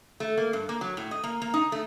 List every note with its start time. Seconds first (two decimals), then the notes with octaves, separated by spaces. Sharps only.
0.20 A3
0.37 A#3
0.53 G2
0.69 A#3
0.81 F#3
0.97 A2
1.11 D#5
1.24 A#3
1.42 A#3
1.54 D#4
1.72 A3